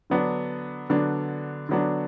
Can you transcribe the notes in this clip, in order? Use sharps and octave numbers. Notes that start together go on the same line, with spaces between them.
D3 F#3 B3 D4
D3 F#3 B3 D4
D3 F#3 B3 D4